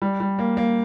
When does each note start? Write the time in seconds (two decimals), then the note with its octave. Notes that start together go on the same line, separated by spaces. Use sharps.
0.02 G3
0.20 G3
0.39 A#3
0.57 A#3